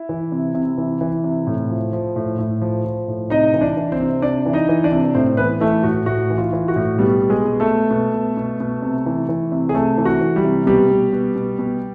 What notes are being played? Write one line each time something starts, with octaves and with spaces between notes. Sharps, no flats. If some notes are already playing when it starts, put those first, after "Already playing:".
Already playing: E4
E3
C3
C3
E3
E3
C3
A2
F3
F3
A2
A2
F3
F3
A2
C3 D#4 D#5
E3
D4 D5
E3
C4 C5
C3
C3 D4 D5
E3
D#4 D#5
E3
D4 D5
C3
A2 C4 C5
E3 B3 B4
E3 A3 A4
A2 F#4
A2 F#4
E3
F4
E3
F#4
A2
B2 G3 G4
B2
G#3 G#4
B2
A3 A4
B2
B2
B2
B2
B2
C3
E3
E3
C3
G#4
C3 A3 A4
E3
F#4
E3
G3 G4
C3
B2 G3 G4
B2
B2
B2
B2